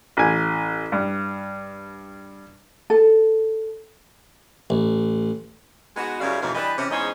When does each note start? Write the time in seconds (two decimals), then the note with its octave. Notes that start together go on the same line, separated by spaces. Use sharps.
0.17 A1 G#5
0.92 G2
2.90 A4
4.70 A1
5.97 G#3 B3 D#4 F#4
6.21 F#2 C#3 G3 E4 C#5 F5
6.42 F2 G#2 B2 E3 F4 F5
6.55 E3 G3 D4 B4 D#5
6.78 C3 E3 C#4
6.91 E2 G#2 C#4 C5 D#5